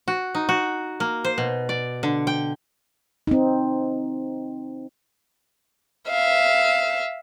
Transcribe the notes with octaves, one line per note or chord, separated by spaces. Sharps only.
F#4
D#4
F#4
A#3
C5
B2
D5
D3
G5
C4 D#4
E5 F5